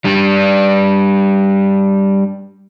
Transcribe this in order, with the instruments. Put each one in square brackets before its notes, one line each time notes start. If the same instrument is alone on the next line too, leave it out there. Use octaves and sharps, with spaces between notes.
[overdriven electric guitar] G3 D4